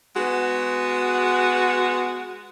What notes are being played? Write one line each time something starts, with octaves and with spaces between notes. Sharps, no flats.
G#3 B3 F#4